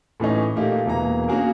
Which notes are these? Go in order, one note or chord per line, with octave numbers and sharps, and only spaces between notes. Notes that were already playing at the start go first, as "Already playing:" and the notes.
A2 E3 C#4 D#4
A#2 A3 A#3 D#4 G4
E1 B2 E3 A#3 A#5
A#3 C#4 D4 F#4 G#4 A#4